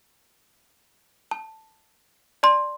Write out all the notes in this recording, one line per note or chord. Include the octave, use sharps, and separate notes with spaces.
A5
D5 A5 C6